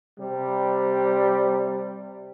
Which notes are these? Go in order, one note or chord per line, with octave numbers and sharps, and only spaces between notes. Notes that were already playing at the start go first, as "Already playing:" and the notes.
C3 G3